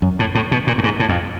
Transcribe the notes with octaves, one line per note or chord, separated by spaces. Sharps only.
F#2
A2
A2
B2
A#2
G2
G#2
A2
F2